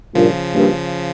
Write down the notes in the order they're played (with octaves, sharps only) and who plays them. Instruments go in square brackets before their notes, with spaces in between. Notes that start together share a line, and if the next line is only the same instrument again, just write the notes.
[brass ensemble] G2 A#2 [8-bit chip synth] C#3 F3
[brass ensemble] G2 A#2